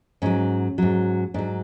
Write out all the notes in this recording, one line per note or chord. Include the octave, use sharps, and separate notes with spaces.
G#2 F#3 C#4
G#2 F#3
G#2 F#3 D4